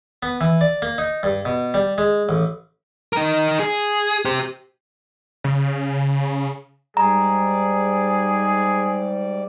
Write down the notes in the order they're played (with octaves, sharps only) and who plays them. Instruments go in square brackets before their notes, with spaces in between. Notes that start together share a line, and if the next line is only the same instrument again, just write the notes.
[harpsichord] B3
E3
D5
A#3
D#4
G2
B2
G3
G#3
A1
[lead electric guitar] D#4 A#4
G#4
G4 C5
[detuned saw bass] C#3
[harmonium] G#2 G3 D5 [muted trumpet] G#4 [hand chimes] A#5